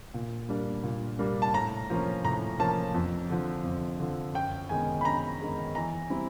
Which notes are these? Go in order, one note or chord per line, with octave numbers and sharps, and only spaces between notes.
A#2
G3 A#3 D4
A#2
G3 A#3 D4
A5
A2 A#5
F3 A#3 C#4
A2 A#5
F3 A#3 C#4 A5
F2
D3 F3
F2
D3 F3
F#2 G5
D#3 G#3 B3 G#5
B5
F#2 A#5
D#3 G#3 B3
E3 A#5
G3 C4 E4